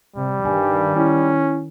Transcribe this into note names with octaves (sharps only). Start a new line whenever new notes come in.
C3 G3
G2 D#3 G#5
C#4 E4